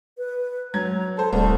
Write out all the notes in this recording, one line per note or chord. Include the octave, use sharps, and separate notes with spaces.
B4
F#3 A#5 G#6
A4 C5 A5
D#1 C2 A3